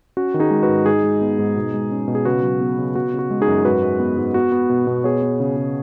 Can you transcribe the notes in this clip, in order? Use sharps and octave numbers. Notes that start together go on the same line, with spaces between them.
C#4 F#4
D#3
D#4 G#4
G#3
F#4 B4
G#2
G#2 D#4 G#4
G#3
B3
G#2
B2
G#3
C#4
B2
G#4
C#3 F#4 B4
F#3
B3
C#3
B3 F#4
C#3
F#4
G#3
D#4 G#4
F#2
G#2 F#4 B4
G#3
B3
G#2
B3 F#4
B3
B2
B2
B3 G#4 C#5
B3
C#3
C#3